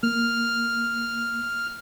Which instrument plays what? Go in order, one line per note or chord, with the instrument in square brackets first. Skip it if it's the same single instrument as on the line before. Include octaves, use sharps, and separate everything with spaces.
[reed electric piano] A#3 [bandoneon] F6